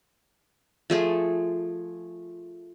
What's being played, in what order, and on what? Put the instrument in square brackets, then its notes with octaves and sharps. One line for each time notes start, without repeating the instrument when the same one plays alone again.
[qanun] F3 A3 G#4